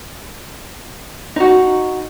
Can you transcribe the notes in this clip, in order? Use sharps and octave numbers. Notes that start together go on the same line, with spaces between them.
D#4 F#4